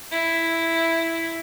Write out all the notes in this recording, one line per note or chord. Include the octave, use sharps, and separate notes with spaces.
E4